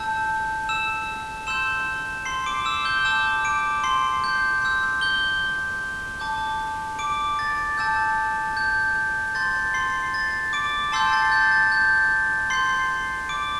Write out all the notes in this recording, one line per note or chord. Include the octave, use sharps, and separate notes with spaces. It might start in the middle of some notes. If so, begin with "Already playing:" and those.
Already playing: A5 E6 G6
E6 E7
C6 E6 G6 E7
C6 C7
D6 D7
E6 E7
G6 G7
A5 D6 E6 G6 E7
D6 D7
C6 C7
G6
C6 E6 G6
G6 G7
A5 D6 G6
D6 D7
A6
A5 E6 G6
G6
C6 G6 A6
C6 C7
A6
D6 D7
A5 C6 E6 G6 C7
A6
A6
G6
A6
G6
C6 G6 C7
D6 D7